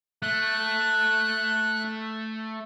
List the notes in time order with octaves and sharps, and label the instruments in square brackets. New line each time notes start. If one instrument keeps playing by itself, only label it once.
[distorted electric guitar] A3 [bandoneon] F#6